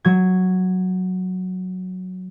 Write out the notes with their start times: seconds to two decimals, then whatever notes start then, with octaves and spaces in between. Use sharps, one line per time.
0.05 F#3 G#6